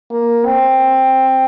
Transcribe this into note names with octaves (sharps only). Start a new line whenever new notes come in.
A#3
C4